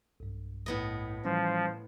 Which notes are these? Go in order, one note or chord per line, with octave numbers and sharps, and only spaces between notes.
B1 G2
A2 B3 D#5
E3 F3 G3 C#4